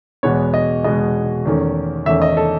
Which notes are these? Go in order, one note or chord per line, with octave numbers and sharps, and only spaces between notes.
E2 B2 G#3 B3 C#5
D#5
E2 B2 G#3 B3 D#5
E2 D#3 A3 C#4
E2 D#3 A3 C#4 E5
D#5
A4